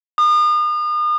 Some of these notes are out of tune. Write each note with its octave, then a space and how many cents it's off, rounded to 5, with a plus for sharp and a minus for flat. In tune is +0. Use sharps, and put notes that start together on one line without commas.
D#6 -40